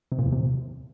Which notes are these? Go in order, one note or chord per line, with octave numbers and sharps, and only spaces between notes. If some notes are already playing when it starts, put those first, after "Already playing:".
C3
A#2
E2
C3